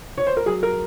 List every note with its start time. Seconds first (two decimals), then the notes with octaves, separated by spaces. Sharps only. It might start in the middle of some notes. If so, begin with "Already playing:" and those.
0.18 C#5
0.27 C5
0.37 A#4
0.46 F#3 G#4
0.63 A#4